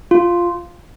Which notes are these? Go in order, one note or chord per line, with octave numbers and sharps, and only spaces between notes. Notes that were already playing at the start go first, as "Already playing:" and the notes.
F4